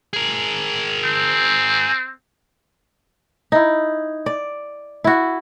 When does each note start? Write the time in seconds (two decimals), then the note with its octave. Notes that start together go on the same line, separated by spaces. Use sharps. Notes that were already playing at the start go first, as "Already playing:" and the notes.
0.13 G#4 A#4
1.05 C4
3.52 D#4 E4
4.26 D5
5.04 E4 F#4